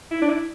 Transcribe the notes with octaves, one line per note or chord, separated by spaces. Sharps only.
E4
D4
E4